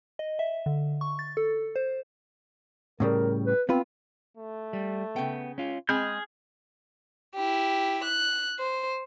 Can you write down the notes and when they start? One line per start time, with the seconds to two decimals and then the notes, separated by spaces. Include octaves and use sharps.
0.19 D#5
0.39 E5
0.66 D3
1.01 C#6
1.19 A6
1.37 A4
1.76 C5
3.00 A2 C#3 G3 A#4
3.46 B4
3.69 B3 C4 F4 B4
4.37 A3
4.73 G3
5.16 C#3 B3 G5
5.58 C#4 F4
5.89 G#3 C4 G#4 G#5 B5 F6 G6
7.35 E4 G4
8.04 F#6
8.59 C5